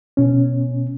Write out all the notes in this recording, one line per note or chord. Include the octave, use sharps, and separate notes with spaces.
B2 C#4